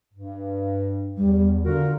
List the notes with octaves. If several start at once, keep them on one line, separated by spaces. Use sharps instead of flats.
G2
E2 G3
D3 F4 F#4 A#4